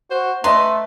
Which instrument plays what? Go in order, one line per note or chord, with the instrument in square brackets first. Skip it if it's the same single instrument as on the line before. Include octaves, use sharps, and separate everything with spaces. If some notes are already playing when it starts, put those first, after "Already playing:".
[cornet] F#4 [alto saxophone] C5
[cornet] A3 [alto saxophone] B4 [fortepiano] D#5 A5 A#5 [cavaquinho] C6